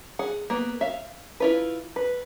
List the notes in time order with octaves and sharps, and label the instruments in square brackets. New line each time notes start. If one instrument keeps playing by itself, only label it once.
[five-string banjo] G#4 F#5
A#3 B3
E5 F5
E4 F4 B4
B4